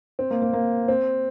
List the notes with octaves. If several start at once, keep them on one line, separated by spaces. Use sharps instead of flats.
C4
A#3
A#3
A#3
C4